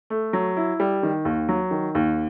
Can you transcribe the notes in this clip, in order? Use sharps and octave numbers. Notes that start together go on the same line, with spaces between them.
A3
F#3
E4
G3
D#3
D#2
F#3
D#3
D#2